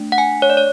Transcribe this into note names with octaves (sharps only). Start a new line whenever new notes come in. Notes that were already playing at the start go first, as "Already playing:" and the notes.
Already playing: A3 D4
F#5
G#5
C#5
D5
C#5